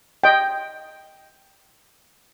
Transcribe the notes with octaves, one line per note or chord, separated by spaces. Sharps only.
D#5 G5